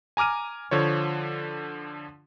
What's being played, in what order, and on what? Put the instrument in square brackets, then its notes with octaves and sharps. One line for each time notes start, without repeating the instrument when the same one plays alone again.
[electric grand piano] G#5 A#5 D6 F6 D#7
D3 F3 C#5